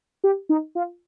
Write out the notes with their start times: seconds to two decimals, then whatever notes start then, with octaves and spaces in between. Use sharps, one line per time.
0.24 G4
0.49 D#4
0.75 F4